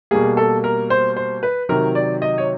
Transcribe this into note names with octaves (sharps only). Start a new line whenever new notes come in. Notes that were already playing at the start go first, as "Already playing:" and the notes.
B2 G3 A#3 G#4
A4
A#4
C5
C5
B4
C3 D#3 F#3 A#4
D5
D#5
C#5